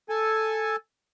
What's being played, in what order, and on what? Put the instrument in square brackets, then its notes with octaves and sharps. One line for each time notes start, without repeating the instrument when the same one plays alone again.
[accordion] A4 G#5